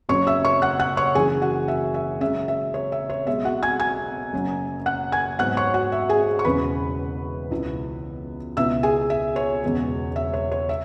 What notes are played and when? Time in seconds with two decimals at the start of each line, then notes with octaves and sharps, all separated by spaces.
0.09 F#1 F#2 C#3 F#3 C#4 C#5 C#6
0.27 E5 E6
0.45 C#5 C#6
0.62 F#5 F#6
0.79 F#5 F#6
0.97 C#5 C#6
1.15 F#1 F#2 E3 G#4 G#5
1.42 F#4 F#5
1.68 E5
1.94 E5
2.21 F#2 C#3 G#3 C#4 E5
2.48 E5
2.74 C#5
2.92 E5
3.10 C#5
3.27 B1 B2 G#3 E5
3.45 F#4 F#5
3.63 G#5 G#6
3.80 G#5 G#6
4.33 F#1 F#2 F#3
4.86 F#5 F#6
5.12 G#5 G#6
5.39 G#2 F#3 B3 F#5 F#6
5.57 C#5 C#6
5.74 F#4 F#5
5.92 E5
6.09 G#4 G#5
6.39 C#6
6.45 E1 E2 C#3 E3 C#4 B4 B5
7.51 C#2 B2 B3 E4
8.57 C#2 B2 B3 E4 E5 E6
8.83 G#4 G#5
9.10 E5
9.36 C#5
9.63 E1 E2 C#3 G#3 B3
10.16 E5
10.34 C#5
10.52 C#5
10.69 E5